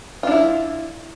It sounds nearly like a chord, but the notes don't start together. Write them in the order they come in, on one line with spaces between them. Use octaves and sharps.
F4 D4 E4